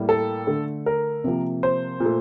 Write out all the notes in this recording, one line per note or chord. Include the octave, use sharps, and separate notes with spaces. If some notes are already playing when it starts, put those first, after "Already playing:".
Already playing: A2 G3 A#3
A4
D3 A3
A#4
C3 F3 A#3
C5
A#2
A3